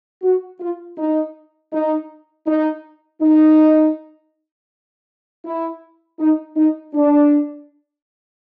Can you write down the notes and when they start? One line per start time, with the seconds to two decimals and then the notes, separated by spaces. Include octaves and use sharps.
0.22 F#4
0.60 F4
0.98 D#4
1.72 D#4
2.47 D#4
3.21 D#4
5.45 E4
6.19 D#4
6.56 D#4
6.94 D4